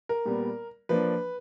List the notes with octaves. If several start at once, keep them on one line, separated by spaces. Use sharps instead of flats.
A#4
A#2 G3 B3
F3 A#3 D4 B4